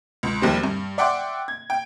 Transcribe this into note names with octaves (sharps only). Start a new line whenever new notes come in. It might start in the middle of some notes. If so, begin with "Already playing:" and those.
C#2
A#1 D#2 G3 C4
G2
D5 E5 F#5 G5 C6 D6
G#6
G5